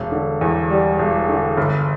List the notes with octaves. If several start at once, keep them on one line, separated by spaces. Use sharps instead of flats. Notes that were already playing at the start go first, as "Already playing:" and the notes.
Already playing: E1
D3
E2
G3
E1
D3
G1